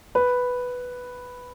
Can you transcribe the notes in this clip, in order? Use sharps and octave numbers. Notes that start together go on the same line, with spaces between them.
B4